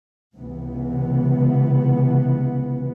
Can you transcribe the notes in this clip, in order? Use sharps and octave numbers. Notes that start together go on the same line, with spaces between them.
C#2 C3 E3 B3